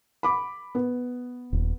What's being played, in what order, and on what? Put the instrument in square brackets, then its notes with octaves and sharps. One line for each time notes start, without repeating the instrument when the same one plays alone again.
[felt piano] B5 D6
B3
[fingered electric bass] D#1